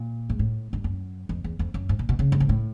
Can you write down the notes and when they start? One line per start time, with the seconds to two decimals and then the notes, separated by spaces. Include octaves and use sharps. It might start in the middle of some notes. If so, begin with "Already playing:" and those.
Already playing: A#2
0.30 G#2
0.39 A2
0.73 G2
0.84 F#2
1.29 F2
1.44 E2
1.59 F2
1.74 F#2
1.89 G#2
1.99 A#2
2.09 B2
2.19 C#3
2.32 G2
2.40 G#2
2.49 A2